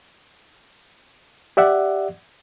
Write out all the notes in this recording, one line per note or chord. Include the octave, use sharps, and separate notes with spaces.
G4 D5 E5 F#5